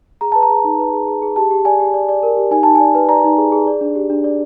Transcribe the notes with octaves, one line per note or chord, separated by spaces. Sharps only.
G#4 A#5
B4 A5
A#5
G#4
D#4
B4
G#4
G#4
G#4
G4 A5
G4
D5 G#5
G4
D5
D5
A#4
G4
D#4 G#5
D#4 A5
G#5
D5
B4
D5 A#5
D#4
G#4
G#4
D5
D4
G4
D4
D5